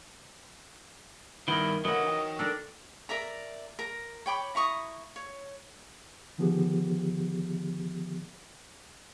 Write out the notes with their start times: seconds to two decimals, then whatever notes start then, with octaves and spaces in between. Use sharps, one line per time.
1.48 G2 D#3 B3 E4 A#4
1.85 E3 F#3 A#3 A4 D#5 F#5
2.04 D#4 G5
2.39 D4 A4 A#4 D5
3.09 A#4 D5 E5 A#5
3.79 A#4 A#5
4.26 C#5 G5 B5 D6
4.55 E4 A#5 C#6 D#6
5.16 C#5
6.38 D3 D#3 F3 B3 G4 G#4